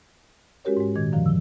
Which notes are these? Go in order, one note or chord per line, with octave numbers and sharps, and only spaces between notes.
G#3 C#4 F#4 G4 A#4 C#5
G#2 G#3
A#2 D#3 G#6
F#2 D3 D#3 F3
F3 E6